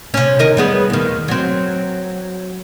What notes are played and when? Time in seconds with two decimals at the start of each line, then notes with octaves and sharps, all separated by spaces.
0.14 C3 C#4
0.39 D#3 A#4 D#5
0.57 G3 B3 G#4
0.90 D#2 D#3
1.28 F#3 C4